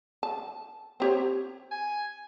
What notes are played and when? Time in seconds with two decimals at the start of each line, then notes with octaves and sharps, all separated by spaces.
0.23 A5
1.00 C4 G4 C#5
1.71 G#5